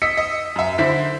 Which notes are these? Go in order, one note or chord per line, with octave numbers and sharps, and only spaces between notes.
D#5 E6 B6 C#7
D#5
F#2 E5
D3 E4 C5 B6